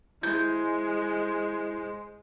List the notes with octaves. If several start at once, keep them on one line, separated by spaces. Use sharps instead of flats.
G#3 E4 C5 G6